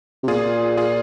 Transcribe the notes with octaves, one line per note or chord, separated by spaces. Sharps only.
C3
A#2 F4 G#4
F4 G#4